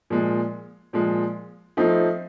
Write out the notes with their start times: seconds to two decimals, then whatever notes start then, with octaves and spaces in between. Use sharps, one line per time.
0.10 A#2 F3 G#3
0.93 A#2 F3 G#3
1.77 F3 A3 C4 D#4